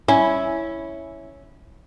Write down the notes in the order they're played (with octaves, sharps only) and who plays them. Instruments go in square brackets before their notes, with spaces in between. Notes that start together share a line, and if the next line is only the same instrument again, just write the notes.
[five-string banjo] C#4 [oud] E4